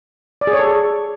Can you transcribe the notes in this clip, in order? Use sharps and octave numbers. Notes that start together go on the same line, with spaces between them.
D5
G#4
C#5
A4